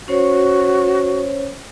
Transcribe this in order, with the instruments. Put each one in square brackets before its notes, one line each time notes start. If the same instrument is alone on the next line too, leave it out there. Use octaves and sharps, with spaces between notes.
[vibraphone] C#4 C5 C#5 [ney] F#4